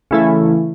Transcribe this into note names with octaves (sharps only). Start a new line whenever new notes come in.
C#3 E3 A3 E4